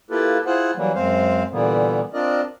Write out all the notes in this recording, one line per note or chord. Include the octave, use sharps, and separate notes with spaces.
A#3 E4 F4 G4 A4 B4
E4 F4 G#4 C5 F#5
E3 F#3 G3 A#3
F#2 G#3 C4 C5 F5
A#2 D3 E3 G3 A#3 B3
C4 D4 F4 A#4 D5 D#5